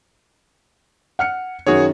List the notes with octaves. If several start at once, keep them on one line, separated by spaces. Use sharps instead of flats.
F#5 F6 C#7
F#2 D#3 F#4 G#4 C#5